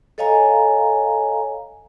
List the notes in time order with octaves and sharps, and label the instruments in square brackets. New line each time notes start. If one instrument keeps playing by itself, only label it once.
[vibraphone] A4 C#5 D#5 F5 G#5 A#5